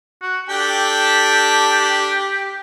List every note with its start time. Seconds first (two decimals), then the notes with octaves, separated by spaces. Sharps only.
0.22 F#4
0.49 D4 G4 A4 G5